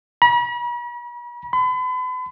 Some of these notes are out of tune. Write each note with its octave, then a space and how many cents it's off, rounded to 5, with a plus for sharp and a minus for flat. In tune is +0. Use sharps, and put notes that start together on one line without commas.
B5 -45
B5 +40